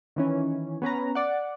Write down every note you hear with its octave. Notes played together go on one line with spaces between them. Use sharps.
D#3 E3 C#4
B3 C#4 B4 A#5
D5 F#5